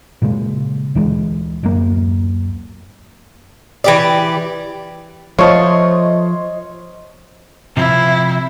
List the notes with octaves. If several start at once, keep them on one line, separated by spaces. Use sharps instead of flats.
A#2 C#3 G#3
D2 E3 F3 G#3
D1 F#2 A#3
E3 G4 D5
F3 A3 F4 C5 C#5 D#5 C6
C3 F3 C4 E4